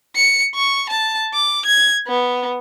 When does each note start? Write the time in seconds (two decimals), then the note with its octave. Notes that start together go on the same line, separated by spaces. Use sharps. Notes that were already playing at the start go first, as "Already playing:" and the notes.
0.16 C#7
0.55 C#6
0.89 A5
1.34 D6
1.66 G#6
2.07 B3